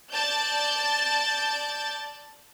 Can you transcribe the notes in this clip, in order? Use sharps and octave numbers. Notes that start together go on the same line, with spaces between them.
D5 A5 G6 A6